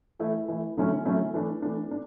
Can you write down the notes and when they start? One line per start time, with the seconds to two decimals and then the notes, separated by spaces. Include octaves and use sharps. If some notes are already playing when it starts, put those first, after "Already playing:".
0.19 E3 A3 E4
0.48 E3 A3 E4
0.77 D3 F#3 A3 C#4 E4
1.05 D3 F#3 A3 C#4 E4
1.34 E3 A3 D4
1.62 E3 A3 D4
1.91 D4